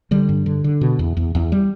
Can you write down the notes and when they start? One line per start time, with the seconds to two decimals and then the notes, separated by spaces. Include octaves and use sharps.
0.11 D3 G3
0.29 G2
0.46 D3
0.64 D3
0.81 B2
0.99 E2
1.17 E2
1.35 E2
1.52 G3